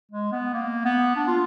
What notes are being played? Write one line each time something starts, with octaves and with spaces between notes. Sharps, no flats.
G#3
B3
A#3
B3
D4
F4